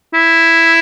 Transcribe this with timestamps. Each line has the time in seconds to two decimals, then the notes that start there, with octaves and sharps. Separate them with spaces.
0.14 E4